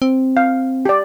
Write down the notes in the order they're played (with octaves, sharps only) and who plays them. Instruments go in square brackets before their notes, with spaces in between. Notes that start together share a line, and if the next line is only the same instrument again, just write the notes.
[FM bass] C4
[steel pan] F5
G4 D5